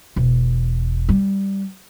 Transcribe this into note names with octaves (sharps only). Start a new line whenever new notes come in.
E1
G3